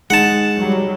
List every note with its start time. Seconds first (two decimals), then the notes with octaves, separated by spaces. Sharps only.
0.10 G#3 D#4 F#5 A5
0.57 F#3 G3